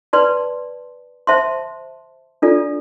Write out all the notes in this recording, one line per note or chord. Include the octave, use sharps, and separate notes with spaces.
B4 D5 A5 C6
C5 E5 A5 C6
D4 F4 A4 D5